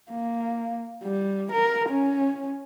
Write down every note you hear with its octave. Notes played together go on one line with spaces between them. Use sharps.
A#3
G3
A#4
C#4